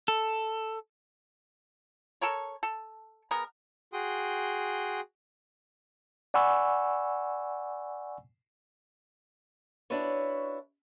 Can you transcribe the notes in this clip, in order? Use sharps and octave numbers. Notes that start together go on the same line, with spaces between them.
A4
A4 A#4 C#5
A4
G#3 B3 A#4
F#4 G#4 G5 C6 D#6
D5 F#5 G#5 B5 C#6 E6
C#4 D4 E4 F#4 B4 C#5